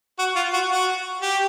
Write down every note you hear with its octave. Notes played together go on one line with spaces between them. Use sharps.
F#4
F4
F#4
F#4
G4